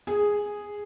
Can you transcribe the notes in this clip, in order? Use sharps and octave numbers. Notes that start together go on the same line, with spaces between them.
G#4